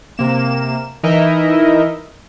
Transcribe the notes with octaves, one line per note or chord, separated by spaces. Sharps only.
C3 A#3 E7
E3 D#4 E4 A#4 D#5 E5